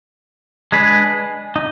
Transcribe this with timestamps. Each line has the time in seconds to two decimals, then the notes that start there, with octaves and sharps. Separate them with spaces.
0.72 G#3 D4 G#4 B4
1.56 D#4